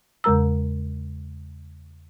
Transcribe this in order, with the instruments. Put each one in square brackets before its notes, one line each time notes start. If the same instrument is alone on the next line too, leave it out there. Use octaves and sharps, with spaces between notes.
[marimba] E2 C#3 G#3 A#4 A#5 E6